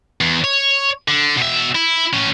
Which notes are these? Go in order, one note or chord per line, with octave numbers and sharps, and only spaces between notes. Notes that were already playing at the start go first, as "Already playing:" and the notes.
E2
C#5
D3
B2 E5
E4
A2 C#4